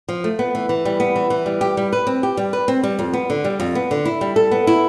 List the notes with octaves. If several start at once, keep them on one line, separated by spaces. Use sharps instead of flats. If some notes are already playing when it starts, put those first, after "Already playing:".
F3
A3
B3
E3
E3
G3
B3
E3
E3
G3
G4
G3
B4
C4
G4
G3
B4
C4
G3
F2
B3
D3
G3
F2
B3
D3
E4
G3
A4
B3
E4